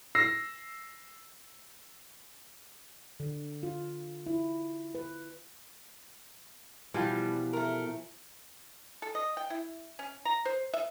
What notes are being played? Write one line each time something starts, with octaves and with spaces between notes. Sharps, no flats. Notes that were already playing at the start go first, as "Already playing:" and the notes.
E6 A#6 C7
D3
F4
E4
B4
B2 E3 F3 G3 G4 F5
A3 A#4
A4
D#5
G5
E4
C#4
A#5
C5
E5